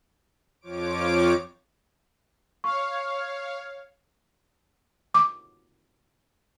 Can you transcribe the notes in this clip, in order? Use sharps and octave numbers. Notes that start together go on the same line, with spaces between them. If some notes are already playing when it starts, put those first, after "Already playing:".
F2 F3 C#5 D6 D7
C#5 F5 C#6
D6